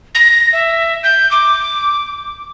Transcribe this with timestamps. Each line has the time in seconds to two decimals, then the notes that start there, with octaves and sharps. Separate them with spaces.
0.15 A#6
0.53 E5
1.04 G6
1.31 D6